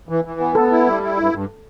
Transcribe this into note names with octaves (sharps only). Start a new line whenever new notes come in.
E3
E3
B3
B3 A4
E4
G3
E4
G2
G2